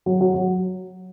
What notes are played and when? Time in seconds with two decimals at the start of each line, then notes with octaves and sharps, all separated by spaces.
0.06 F#3
0.21 F#3
0.34 F#3